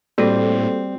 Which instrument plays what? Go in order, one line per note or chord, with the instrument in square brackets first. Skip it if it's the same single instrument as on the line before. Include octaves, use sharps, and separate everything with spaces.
[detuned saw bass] A2 [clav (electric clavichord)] G3 [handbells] A#3 F#4 A4 [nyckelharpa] C4